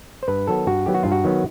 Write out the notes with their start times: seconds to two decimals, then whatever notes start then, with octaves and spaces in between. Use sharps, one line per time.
0.23 C5
0.28 G2 B4
0.47 D#3 F#3 B3 A4
0.67 G2 F#4
0.86 D#3 F#3 B3 G4
0.94 F#4
1.03 G2 F4
1.12 F#4
1.24 D#3 F#3 B3